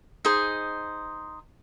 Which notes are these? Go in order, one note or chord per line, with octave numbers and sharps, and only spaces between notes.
D#4 G#4 C5